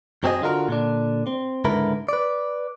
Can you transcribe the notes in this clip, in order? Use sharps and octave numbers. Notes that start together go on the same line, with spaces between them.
F#2 F#3 C4 C#4 G#4 D#5
D3 F4 F#4 A#4
A#2 D3 D4
C4
C#2 G#2 D3 E4 A#4 B4
B4 D5